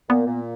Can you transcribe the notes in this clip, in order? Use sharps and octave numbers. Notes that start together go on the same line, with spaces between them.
A#2 B3
A#2